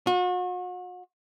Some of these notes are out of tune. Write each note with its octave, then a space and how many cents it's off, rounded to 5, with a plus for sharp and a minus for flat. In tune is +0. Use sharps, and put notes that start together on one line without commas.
F#4 -40